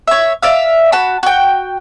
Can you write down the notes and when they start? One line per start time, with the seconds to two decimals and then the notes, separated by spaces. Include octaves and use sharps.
0.08 C#5 E5
0.42 D5 E5 F5
0.92 F#4 A5 B5
1.23 F#4 G5